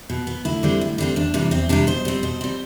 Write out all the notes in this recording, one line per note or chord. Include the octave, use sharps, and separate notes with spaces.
B2
B3
D2 E4
D3 G3 C4
D2
D3 G3 C4
E2 D4
C3 E3 G3
E2 C4
C3 E3 G3 D4
B2 C5
G3 C4
B2 C5
G3 C4